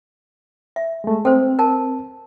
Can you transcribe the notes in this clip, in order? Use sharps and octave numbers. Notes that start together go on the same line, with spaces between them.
E5
G#3 A3
C4 A4 B4 C5
A#4 A5